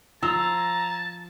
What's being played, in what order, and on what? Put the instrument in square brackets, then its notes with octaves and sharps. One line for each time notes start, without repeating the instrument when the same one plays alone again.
[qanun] F3 [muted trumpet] A5 [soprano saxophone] A#5 [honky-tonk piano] E6